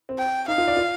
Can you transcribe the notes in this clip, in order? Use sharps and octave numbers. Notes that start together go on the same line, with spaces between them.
C4
G5
D#4 F5
F4
D5
F4